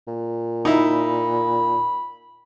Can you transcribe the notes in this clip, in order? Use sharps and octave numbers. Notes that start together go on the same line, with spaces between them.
A#2
D#4 E4 B5